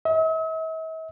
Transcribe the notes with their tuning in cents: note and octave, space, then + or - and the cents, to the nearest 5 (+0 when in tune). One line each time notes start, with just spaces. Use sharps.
E5 -45